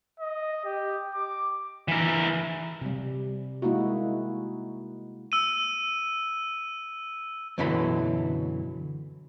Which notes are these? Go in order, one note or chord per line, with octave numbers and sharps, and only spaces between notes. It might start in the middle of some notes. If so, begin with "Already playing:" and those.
D#5
G4
D6
E3 A#4
C3 G3
G#3 A#3 D#4 E4 F#4
E6 D#7
F#2 B2 D3 E3 F#3 B5